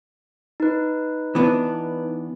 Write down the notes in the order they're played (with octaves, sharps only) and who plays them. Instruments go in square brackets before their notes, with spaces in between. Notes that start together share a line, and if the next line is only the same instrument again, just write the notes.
[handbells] D#4 B4
[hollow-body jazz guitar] E3 B3 D4